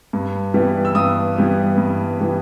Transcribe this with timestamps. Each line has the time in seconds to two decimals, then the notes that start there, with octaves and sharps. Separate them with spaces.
0.13 G2
0.54 E3 G3 B3
0.85 E6
0.95 G2 D#6
1.36 E3 G3 B3
1.78 G2
2.19 E3 G3 B3